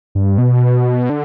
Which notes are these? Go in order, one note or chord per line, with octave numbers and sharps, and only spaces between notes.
G2
B2
D3